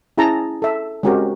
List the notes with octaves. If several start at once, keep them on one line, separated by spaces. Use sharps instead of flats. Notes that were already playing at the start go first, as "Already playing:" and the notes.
C#4 E4 G#4 A5 A#5
A4 E5
G#3 C4 C#4 F#4 G4 A#4